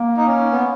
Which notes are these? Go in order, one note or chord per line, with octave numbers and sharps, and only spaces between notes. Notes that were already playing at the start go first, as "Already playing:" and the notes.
Already playing: A#3
D#4
C#4
B3